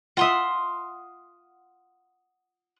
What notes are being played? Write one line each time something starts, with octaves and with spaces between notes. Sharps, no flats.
F4 E5 F#5 C6 D#6